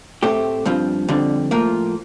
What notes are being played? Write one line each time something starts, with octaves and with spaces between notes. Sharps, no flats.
A2 A3 C4 G4
G2 F3 C4
F2 D3 G3 C4
A2 F3 A#3 F4